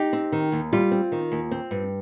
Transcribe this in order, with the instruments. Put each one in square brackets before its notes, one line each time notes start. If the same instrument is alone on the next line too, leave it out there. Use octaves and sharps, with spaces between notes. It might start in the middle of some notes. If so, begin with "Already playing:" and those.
Already playing: [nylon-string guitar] D#4 G4
C4
D#3
D#2
G3 F4
C4
D#3
D#2
C4
G2